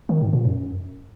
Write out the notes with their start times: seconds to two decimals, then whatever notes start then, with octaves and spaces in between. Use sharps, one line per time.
0.09 D#3
0.21 G#2
0.33 A#2
0.45 F#2